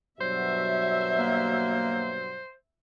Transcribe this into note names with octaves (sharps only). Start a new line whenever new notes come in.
G2 B2 F#3 C5 E5
A#3